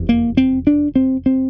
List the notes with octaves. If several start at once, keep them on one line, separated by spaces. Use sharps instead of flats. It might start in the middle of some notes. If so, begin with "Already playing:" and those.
Already playing: F1 E2 C3
A#3
C4
D4
C4
C4